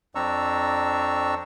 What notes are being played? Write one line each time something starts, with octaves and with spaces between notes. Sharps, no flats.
F2 C4 D4 A#5 C#6 E6